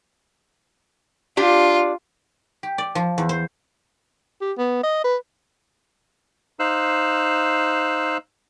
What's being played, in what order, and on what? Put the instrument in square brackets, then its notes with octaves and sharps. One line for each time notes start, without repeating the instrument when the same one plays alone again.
[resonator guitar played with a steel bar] D4 G4 A5 [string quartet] F4
[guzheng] G4
D5
F3
E2
C5
[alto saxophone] G4
B3
D#5
B4
[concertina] D#4 C5 F5 E6 F#6